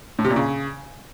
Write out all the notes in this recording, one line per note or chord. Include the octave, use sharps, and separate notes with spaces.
A2
C3
A#2
C#3